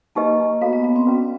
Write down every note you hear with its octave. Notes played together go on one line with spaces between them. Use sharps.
A#3 D#4 G4 B4 D#5
B3 F#4 A4 C#5 F5
B3
B3
C4
C#4 F#4 B4 D5